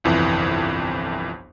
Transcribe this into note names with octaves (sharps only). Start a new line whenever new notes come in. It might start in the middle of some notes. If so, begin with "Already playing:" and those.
G1 C2 F2 E3